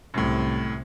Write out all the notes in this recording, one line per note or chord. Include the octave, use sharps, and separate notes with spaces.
C2 F#2 A2 C3